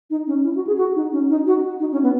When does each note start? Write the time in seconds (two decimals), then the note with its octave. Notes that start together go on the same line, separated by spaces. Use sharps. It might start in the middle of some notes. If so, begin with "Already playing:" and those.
0.10 D#4
0.27 C#4
0.44 E4
0.55 F#4
0.67 G#4
0.77 F#4
0.95 D#4
1.12 C#4
1.29 D#4
1.47 F#4
1.80 D#4
1.92 C#4
2.03 B3